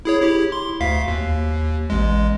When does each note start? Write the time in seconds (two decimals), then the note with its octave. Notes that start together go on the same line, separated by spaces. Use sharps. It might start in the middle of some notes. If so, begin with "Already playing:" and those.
0.05 E4 G#4 C#5
0.22 E4 G4
0.52 C6
0.80 D2 F5 B6
1.08 D#2
1.90 A1 G#3